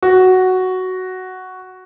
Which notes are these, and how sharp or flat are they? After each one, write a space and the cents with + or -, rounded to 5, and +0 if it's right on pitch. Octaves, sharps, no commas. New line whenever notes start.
F#4 +5